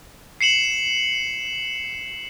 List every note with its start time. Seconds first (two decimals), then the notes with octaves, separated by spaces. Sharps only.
0.41 C7 C#7 E7 F#7